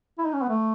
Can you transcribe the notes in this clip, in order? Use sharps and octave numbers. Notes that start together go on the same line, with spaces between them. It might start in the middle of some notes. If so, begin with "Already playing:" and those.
E4
D#4
C#4
B3
A3